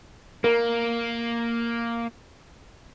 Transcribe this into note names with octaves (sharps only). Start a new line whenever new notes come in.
A#3 A#4